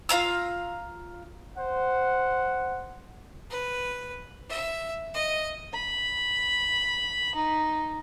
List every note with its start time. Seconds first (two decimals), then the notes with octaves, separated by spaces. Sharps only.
0.09 F4 F5 A#5 E6
1.56 C5 F#5
3.50 B4
4.49 E5
5.14 D#5
5.73 B5
7.35 D#4